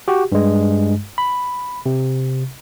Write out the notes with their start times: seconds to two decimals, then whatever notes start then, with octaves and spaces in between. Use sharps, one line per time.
0.08 F#4 G4
0.32 G2 G#3
1.18 B5
1.86 C3